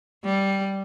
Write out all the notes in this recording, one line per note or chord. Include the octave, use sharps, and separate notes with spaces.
G3